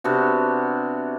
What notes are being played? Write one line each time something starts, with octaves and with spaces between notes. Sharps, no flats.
C3 B3 D4 F#4